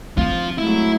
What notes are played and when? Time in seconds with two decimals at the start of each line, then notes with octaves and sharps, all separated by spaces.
0.18 F3 C4 F4
0.58 F#3 G#3 A3 E4